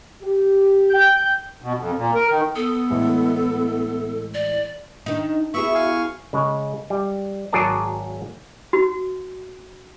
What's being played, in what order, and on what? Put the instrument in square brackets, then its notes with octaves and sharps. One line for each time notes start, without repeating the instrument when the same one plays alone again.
[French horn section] G4
[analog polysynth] G5 G6
[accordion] B2
F2
A#2
A#4
D#3
[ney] B3 [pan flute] A4 [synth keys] D#6
[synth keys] A2 E3 G#3
[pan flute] D5
[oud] D#3 D#4 [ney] D4
[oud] B3 E4 G#4 [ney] F#4 [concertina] E5 C#6
[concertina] F5 G#5 C#6
[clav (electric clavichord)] C#3 G#3
G3
G#1 F#3 G#4 A#4 D5 A5
[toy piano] F#4